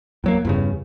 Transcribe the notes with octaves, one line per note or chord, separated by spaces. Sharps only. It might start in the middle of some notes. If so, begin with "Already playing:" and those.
E2 F#3 A#3
E2 G2 C#3